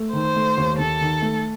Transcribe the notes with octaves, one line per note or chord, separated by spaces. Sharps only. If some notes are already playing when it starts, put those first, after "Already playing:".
Already playing: A3
D#3 C5
A3
D#2
D#2 A4
D#3
A3